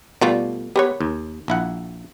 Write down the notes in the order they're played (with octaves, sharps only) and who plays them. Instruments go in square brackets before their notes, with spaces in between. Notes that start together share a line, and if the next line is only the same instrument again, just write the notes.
[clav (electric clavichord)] B2 G3 [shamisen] A3 F4 D5
[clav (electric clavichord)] B3 B4 [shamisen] G4 A#4 C#5
[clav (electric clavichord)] D#2
A#1 E4 F#5